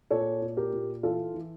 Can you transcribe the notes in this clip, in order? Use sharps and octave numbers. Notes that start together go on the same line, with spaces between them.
A#2 A4 C#5
A#2
G4 A#4
A#2
E3 F4 A4
E3